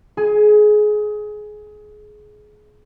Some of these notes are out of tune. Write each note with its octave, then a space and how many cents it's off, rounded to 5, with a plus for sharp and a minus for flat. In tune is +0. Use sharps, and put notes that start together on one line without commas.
G#4 +25 G#5 +0